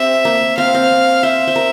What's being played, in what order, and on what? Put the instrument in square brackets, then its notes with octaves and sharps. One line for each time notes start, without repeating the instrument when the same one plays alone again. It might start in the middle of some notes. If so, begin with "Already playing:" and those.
Already playing: [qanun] C4 G4 [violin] E5
[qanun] A#3
[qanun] C4 [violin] F5
[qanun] C4
[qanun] C5 [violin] E5
[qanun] C5
A#4